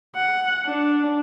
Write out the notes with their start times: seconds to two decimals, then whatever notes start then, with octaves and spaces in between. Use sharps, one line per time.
0.15 F#5
0.65 D4